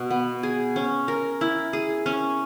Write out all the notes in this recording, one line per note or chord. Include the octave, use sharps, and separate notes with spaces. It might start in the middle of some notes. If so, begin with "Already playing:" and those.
Already playing: B2
B3
G#4
C#4
A#4
E4
G#4
C#4